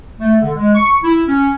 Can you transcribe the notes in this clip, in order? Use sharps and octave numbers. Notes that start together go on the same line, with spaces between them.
A3
D3
G#3
C#6
E4
C#4